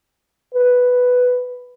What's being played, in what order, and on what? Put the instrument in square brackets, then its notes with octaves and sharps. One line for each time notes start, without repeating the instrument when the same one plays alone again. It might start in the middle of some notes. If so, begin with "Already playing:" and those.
[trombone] B4